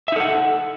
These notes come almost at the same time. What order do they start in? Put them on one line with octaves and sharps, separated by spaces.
E5 D#4 A4 F#5